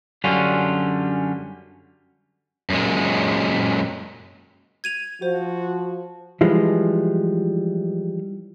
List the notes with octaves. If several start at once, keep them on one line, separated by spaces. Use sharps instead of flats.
F#2 D3 G3 C#4 D4 F4
F#2 A#2 G#3
G#6 D#7 F7
F3 F#4 C5
E3 F3 G3 G#3